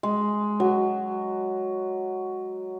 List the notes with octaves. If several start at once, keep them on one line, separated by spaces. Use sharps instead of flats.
G#3
F#3